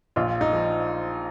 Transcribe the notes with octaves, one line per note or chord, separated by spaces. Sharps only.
A#1 F4
D#4
F3